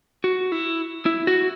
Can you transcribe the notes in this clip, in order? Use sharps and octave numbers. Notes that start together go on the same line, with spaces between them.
F#4
E4
E4
F#4